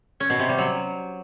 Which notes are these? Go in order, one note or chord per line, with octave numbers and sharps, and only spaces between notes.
C#4
B2
C3
G3
F#3